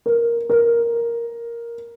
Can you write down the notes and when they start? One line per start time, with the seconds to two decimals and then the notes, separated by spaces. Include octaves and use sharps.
0.06 A#4
0.50 A#4